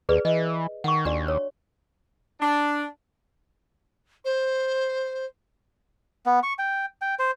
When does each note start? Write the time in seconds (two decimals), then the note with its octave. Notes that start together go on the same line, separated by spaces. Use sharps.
0.09 D#2 G#4 B4 D5
0.25 E3 D#5
0.84 D#3 F#5 C#6
1.05 D#2 D4 F#4 D5
1.28 C#5
2.41 D4
4.24 C5
6.26 B3
6.43 C#6
6.59 G5
7.02 G5
7.19 C5